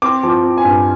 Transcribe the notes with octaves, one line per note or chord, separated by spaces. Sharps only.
C4 D6
F3
D6
C4
G#5
G2